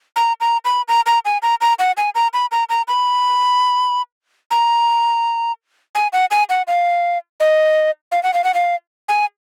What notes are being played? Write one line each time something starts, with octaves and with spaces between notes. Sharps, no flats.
A#5
A#5
B5
A#5
A#5
G#5
A#5
A#5
F#5
G#5
A#5
B5
A#5
A#5
B5
A#5
G#5
F#5
G#5
F#5
F5
D#5
F5
F#5
F5
F#5
F5
G#5